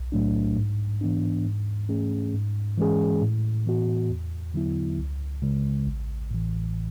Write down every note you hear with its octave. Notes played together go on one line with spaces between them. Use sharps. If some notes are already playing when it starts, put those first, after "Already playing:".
Already playing: B1
A2 F#3 A3 D4
G#2
E3 B3 D4
G#2
E3 A3 C#4 G#4
G#2
E3 G#3 C#4 G#4
A2
E3 B3 F#4
E2
D3 F#3 B3 E4
C#2
C#3 G#3
A1
A2 E3